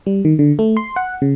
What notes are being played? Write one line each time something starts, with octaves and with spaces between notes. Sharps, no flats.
G3
D#3
D3
A3
C6
F#5
C#3